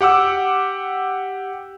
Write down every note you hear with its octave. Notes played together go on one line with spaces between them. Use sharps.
G4 F#5 D6 E6